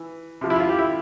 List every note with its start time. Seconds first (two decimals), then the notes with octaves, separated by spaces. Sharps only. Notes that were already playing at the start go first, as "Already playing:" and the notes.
Already playing: E3
0.41 C3 F3
0.50 E4
0.60 F4
0.69 G4
0.79 E4